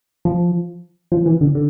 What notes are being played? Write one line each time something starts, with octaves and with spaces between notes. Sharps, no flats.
F3
F3
E3
D3
D3